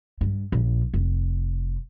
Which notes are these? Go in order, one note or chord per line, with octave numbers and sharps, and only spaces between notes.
G2
A#1
F1